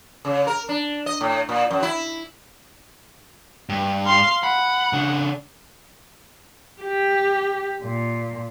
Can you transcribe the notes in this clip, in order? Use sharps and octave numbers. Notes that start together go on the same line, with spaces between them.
C#3
A#4
D4
D#5
A2
A#2
F#2
E4
G2
F5 C6
F#5 B5
C#3 D4
G4
A#2